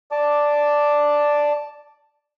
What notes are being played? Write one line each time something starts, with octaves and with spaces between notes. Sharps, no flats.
D5 A5 D6